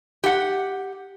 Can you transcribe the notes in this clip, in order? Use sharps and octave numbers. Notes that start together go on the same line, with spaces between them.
G4 F#5